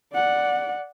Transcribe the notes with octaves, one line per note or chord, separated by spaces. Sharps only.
D5 F#5